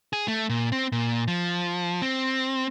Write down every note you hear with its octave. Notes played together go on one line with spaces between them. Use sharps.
G#4
A3
A#2
C4
A#2
F3
C4